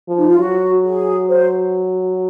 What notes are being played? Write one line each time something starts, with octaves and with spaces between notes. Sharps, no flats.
F3
D#4
F4
F#3 F#4
G#4
C5